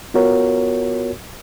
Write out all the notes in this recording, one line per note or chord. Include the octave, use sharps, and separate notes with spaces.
B3 F4 F#4 A#4 C#5